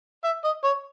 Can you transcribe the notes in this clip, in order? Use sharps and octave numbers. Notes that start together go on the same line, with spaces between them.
E5
D#5
C#5